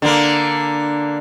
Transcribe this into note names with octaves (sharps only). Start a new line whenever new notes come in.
D3 A#3